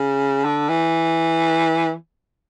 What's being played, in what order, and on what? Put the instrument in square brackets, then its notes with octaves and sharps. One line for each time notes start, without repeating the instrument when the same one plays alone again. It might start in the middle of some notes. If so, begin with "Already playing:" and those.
Already playing: [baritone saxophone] C#3
D3
E3